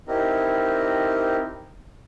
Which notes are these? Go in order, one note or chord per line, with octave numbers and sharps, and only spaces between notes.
C4 D#4 E4 G4 A#4 D#5